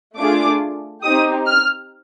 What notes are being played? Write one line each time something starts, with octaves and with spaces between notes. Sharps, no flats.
A3 D4 F4 G#4 D6
C4 D#4 G4 D#6
F6